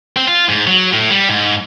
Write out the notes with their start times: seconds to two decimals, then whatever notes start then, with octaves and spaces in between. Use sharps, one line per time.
0.17 C4
0.28 F4
0.49 G#2
0.67 F#3
0.93 A2
1.11 G3
1.29 G#2